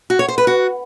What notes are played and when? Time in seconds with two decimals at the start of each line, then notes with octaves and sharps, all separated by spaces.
0.10 F#4
0.19 C#5
0.28 C5
0.38 B4
0.47 F#4